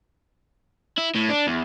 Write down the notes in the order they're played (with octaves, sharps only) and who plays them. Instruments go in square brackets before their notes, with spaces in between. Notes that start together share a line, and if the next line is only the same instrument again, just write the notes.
[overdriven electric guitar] E4
A2
D4
E2